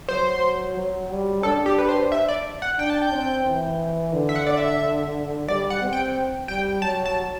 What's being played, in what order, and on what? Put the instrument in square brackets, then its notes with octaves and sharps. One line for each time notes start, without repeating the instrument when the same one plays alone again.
[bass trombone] F#3 [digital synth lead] C5
[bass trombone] F#3
G3
[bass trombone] D4 [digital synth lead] A4
[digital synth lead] G4
B4
C5
E5
D5
F#5
[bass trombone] D4 [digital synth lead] G5
[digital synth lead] A5
G5
[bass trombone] C4
E3
D3
[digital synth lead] E5
F#5
D5
E5
[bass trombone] G3 [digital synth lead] D5
[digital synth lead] F#5
[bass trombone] C4
[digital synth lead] G5
[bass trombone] G3 [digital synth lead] G5
[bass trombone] F#3 [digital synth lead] A5
[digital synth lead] A5